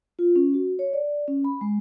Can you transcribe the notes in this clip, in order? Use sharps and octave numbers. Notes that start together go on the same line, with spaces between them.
F4
C#4
F#4
C#5
D5
C#4
B5
G#3